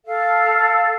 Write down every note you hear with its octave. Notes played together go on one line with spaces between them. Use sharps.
A4 F5